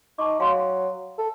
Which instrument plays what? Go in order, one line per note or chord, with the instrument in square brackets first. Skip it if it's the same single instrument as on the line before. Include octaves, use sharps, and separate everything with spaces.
[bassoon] D#4 [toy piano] A5 C#6 D6
[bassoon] F#3 [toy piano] F5 G#5 C6
[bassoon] A4